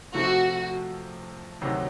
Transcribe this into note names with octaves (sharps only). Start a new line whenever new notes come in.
C3 F3 A3 C4 F#4
D2 C3 D#3 F#3